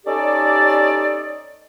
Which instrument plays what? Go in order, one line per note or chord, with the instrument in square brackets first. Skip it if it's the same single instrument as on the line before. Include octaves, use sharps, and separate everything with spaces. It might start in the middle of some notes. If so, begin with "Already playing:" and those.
[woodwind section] C#4 D#4 G4 A4 D5